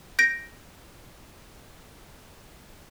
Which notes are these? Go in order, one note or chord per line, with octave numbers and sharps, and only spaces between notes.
G6 A#6 D7